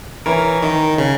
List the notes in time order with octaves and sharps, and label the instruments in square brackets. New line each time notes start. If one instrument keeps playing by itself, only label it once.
[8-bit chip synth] E3 [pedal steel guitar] A#4 C#5
[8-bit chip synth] D#3
C#3